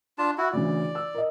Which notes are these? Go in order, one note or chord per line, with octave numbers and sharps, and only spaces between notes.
D4 F4 A5
E4 F#4
D2 C#3 E3 D5
E6
A#4 D#5